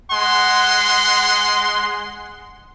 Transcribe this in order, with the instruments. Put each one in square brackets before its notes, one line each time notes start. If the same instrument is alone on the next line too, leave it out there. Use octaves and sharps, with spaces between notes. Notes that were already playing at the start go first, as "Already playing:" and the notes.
[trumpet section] G#3 F#5 C6